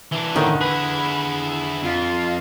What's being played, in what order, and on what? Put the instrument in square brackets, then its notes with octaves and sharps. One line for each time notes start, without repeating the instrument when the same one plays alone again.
[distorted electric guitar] E3 D4
[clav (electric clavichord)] A2 D#3 [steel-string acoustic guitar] D3
[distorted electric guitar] E4 G#4 [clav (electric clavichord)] B4 [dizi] B5
[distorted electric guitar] F2 [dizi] F4